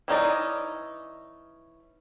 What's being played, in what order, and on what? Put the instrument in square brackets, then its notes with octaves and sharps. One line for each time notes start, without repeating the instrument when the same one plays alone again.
[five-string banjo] E3 C#4 D#4 D5